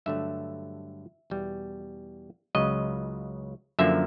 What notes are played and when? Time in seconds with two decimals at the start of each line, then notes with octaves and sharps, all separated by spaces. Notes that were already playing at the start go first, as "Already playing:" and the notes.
0.06 G2 D3 F#3 A3 E5
1.30 E2 B2 G3
2.55 C#2 C#3 F#3 D#5
3.79 F#2 D3 F3 A#3 E5